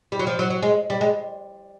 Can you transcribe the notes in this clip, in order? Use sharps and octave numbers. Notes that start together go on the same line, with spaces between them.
G3
F#3
F3
F#3
F#3
G#3
G3
G#3